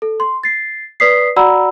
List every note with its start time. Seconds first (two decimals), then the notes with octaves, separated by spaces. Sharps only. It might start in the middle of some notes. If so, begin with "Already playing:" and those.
0.02 A4
0.20 C6
0.43 A6 C7
1.00 B4 D5 D#6 B6 C7
1.36 F#4 D5 F#5 A#5 B5 E6